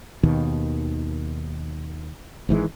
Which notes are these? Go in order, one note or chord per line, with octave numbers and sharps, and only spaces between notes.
D#2 B2 D#3
G#1 G#2 E3 G#3